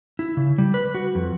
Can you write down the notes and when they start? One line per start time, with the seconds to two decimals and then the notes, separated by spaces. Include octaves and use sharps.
0.19 E4
0.37 C#3
0.58 G3
0.74 B4
0.95 F#4
1.15 F2